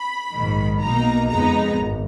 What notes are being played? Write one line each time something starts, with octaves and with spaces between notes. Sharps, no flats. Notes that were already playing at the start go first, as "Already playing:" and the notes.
Already playing: B5
A#1 G#2 D#3
B1 B2 A#3 D#4 A#5
F2 C#3 G#3 B3 D#4 A#5
G#1